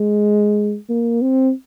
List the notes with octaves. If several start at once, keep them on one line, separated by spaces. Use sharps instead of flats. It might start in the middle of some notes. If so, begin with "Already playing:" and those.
Already playing: G#3
A#3
C4